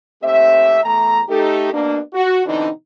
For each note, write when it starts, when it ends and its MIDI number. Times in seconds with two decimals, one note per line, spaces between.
0.23 0.79 39
0.23 0.79 57
0.23 0.79 60
0.23 0.79 67
0.23 0.79 76
0.84 1.21 40
0.84 1.21 57
0.84 1.21 82
1.29 1.71 57
1.29 1.71 63
1.29 1.71 67
1.29 1.71 69
1.72 1.99 47
1.72 1.99 58
1.72 1.99 62
2.14 2.41 66
2.46 2.69 47
2.46 2.69 50
2.46 2.69 52
2.46 2.69 60
2.46 2.69 62
2.46 2.69 63